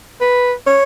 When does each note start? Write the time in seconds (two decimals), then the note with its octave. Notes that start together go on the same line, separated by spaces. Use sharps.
0.21 B4
0.67 C#5